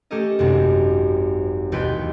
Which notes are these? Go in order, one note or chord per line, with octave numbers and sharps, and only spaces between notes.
A3 C#4 G4 A4 A#4 D#5
G#1 F#2 C3
E1 D#2 B3 B4 G5 C6